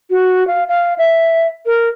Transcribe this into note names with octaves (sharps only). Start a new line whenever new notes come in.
F#4
F5
F5
E5
A#4